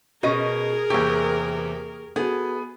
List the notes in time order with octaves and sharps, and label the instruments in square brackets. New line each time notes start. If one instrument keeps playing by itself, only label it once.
[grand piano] B2 [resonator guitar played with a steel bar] C#4 D#5 [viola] G#4 A#4
[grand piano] E2 C3 [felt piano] A#3 C#6 G#6 [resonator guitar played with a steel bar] G4
[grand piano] B3 [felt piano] F#4 A4 [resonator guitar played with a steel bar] G#4